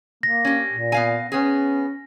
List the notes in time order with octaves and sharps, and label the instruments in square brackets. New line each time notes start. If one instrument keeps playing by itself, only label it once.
[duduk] A#3 [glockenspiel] A#6
[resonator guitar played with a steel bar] C#4 G4
[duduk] A#2
[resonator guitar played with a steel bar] B3 F5 G#5
[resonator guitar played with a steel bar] B3 G#4 [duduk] C#4